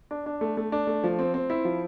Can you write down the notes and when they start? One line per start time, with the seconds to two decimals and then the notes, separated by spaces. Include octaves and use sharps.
0.11 D4
0.26 D4
0.41 A3
0.57 A3
0.72 D4
0.87 A3
1.04 F3
1.19 C4
1.34 C4
1.50 E4
1.65 F3